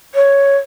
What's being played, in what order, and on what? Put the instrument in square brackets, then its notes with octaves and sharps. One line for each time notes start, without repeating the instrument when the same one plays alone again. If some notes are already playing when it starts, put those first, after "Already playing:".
[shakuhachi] C#5